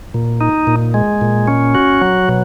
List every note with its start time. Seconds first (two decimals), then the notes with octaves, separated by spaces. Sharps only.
0.14 A#2
0.41 D#4
0.67 A#2
0.94 G#3
1.21 A#2
1.48 C#4
1.75 F#4
2.01 F#3
2.28 B2